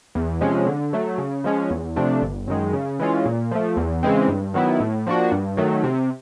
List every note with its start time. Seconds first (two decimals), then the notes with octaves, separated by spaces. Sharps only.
0.15 E2
0.41 C3 F3 G#3 C#4
0.67 D3
0.93 F#3 A3
1.18 C#3
1.44 F3 G#3 C#4
1.70 E2
1.96 C3 F3 A3 D4
2.21 G1
2.48 F#2 D#3 G#3
2.73 C#3
2.99 E3 G#3 C#4 F4
3.25 A#2
3.51 F3 A3
3.77 E2
4.03 C#3 E3 G#3 C4
4.28 G2
4.54 D#3 F#3 B3 E4
4.80 A2
5.07 F3 A#3 D4 F#4
5.32 G2
5.57 D#3 F#3 A3
5.84 C3